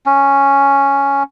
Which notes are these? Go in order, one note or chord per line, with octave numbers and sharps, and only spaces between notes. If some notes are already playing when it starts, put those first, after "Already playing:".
C#4